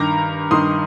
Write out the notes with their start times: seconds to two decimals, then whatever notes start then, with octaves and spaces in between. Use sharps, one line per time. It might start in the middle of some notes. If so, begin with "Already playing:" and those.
Already playing: G2 D#3 A#5 D6
0.51 G2 D#3 C6 D#6